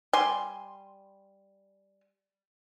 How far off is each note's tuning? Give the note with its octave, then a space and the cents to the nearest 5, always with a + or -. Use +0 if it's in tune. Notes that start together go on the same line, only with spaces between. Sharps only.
G3 +0 G#5 +0 C6 +0